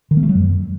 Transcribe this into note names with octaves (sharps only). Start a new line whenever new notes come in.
D#3
A#3
A3
F#3
F#2